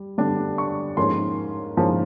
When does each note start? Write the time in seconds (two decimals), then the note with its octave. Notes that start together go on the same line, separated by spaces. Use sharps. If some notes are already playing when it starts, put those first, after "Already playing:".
Already playing: G3
0.18 D3 G3 B3 D4
0.58 C#6
0.97 G#2 F3 A#3 C#4 C6
1.77 G#2 F3 A#3 C#4